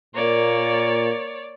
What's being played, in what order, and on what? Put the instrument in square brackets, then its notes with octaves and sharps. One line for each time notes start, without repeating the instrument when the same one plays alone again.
[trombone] A#2 [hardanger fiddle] A#3 [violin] C#5 D5